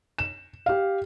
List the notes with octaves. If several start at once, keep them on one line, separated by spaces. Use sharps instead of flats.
E7
G4 F5